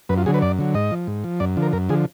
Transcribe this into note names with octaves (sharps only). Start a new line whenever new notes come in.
F#2 B4
F4
D3 F#3 G#4
B4
F#2 D5
D3 F#3
G#2 D#5
F3
G#2
F3
F#2 D5
D3 F3
A#4
F#2 A#4
D3 F3 G#4